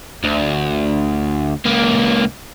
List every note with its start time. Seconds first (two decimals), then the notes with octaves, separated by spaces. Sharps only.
0.24 D2
1.65 C#2 A#3